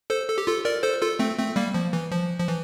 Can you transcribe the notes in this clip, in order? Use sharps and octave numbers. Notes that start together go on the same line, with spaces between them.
A4 C5
A4
G4
F4 A4
A#4 D5
A4 C5
F4 A4
A3 C4
A3 C4
G3 A#3
F3
E3
F3
F3
E3